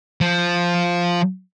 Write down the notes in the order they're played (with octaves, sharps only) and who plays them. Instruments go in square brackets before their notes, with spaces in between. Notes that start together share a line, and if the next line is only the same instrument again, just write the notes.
[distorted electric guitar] F3